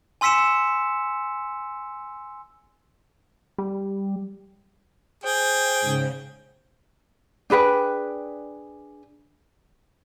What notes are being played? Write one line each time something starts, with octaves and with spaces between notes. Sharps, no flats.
G#5 C6 E6 B6 C#7 E7
G3
G#4 C5 G5
G#2 C#3
D4 G#4 B4 G5